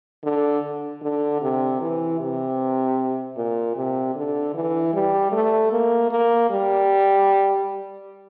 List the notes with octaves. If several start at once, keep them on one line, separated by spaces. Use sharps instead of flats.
D3
D3
C3
E3
C3
A#2
C3
D3
E3
G3
A3
A#3
A#3
G3